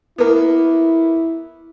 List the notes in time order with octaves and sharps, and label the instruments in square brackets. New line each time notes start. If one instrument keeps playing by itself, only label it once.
[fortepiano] A#3 B3 [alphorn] E4